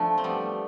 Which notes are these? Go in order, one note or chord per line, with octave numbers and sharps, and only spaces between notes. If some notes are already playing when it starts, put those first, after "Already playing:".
Already playing: F3 A3 D4
C4
G3 B3